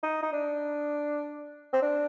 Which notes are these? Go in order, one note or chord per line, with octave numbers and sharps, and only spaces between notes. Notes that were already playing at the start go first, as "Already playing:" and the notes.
D#4
D#4
D4
C4
D4